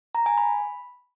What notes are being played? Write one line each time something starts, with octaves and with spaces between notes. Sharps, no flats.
A#5
G#5
B5